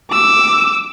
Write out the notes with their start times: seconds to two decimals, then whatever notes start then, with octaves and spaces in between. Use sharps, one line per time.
0.11 D6 E6